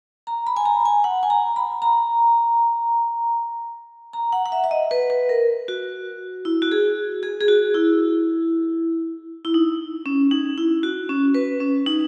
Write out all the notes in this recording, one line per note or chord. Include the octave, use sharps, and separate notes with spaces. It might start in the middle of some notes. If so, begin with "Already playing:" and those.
A#5
B5
G#5
A#5
G#5
F#5
G#5
A#5
B5
A#5
A#5
F#5
F#5
E5
E5
D#5
B4
B4
A#4
F#4
E4
F#4
G#4
G#4
G#4
F#4
E4
E4
D#4
C#4
D#4
E4
F#4
C#4
B4
C#4
D#4